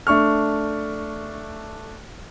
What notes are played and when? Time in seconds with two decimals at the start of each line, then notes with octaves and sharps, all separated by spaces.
0.07 A3 D4 C#6 F6